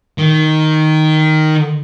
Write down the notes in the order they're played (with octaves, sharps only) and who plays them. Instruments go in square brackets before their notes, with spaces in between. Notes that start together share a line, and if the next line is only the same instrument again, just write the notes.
[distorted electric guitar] D#3